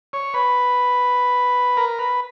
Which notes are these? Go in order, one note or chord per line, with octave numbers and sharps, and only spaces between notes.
C#5
B4
A#4
B4